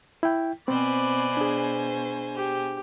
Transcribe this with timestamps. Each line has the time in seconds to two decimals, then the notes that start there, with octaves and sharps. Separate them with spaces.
0.23 E4 G5
0.68 B2 C4 B4 C5 D5 G#5
1.37 D4 G#4
2.36 G4